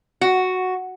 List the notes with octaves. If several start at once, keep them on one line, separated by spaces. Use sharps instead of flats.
F#4